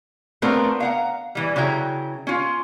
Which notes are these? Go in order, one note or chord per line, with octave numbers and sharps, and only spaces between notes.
A3 B3 C4 D4 F4 A#4
F5 F#5 A#5
E3 G3
C#3 F#3 E4 G5 A#5
C#4 F4